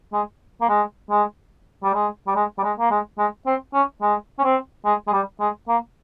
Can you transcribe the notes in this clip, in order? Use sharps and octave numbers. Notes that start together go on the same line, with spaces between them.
G#3
A#3
G#3
G#3
G3
G#3
G3
G#3
G3
G#3
A#3
G#3
G#3
C4
C#4
G#3
C#4
C4
G#3
G#3
G3
G#3
A#3